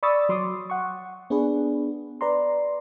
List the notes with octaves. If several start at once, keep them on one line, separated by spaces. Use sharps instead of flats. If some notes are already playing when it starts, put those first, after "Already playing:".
D5 B5 C#6 D#6 E6 A6
F#3 C6 D6 D#6
F#5 C#6
B3 D4 G#4 B4
B4 D5 A#5 C6